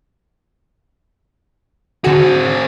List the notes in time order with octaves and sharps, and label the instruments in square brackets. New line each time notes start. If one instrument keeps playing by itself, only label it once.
[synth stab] D3 F#4 [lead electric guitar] C4 G#4